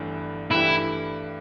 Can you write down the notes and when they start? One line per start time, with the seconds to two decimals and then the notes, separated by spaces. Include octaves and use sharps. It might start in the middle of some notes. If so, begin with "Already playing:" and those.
Already playing: G1 G2 E3 A3
0.50 G2 E3 A3 E4 G4 B4